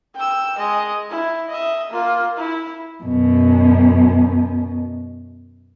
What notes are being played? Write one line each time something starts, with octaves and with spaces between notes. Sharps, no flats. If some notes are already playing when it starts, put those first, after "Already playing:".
G5 E6
G#3 D#5
E4
D#5 E5
A#3 F4
E4
F#2 B2